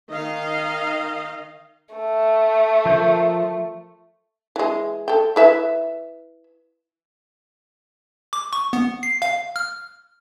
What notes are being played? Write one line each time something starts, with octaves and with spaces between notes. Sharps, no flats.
D#3 D#5 F5
A3
F3 A#4 G6
E3 G#3
A4 G5
E4 B4 E5
D6
C#6
B3
C7
F5
F6